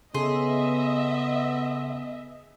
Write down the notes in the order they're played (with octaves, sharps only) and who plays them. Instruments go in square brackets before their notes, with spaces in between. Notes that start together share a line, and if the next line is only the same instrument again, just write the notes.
[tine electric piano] C#3 A4 C6 [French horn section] B3 [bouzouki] G#4 [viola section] D#5 E5